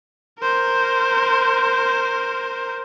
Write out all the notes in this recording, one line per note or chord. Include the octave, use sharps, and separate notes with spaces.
A#4 C5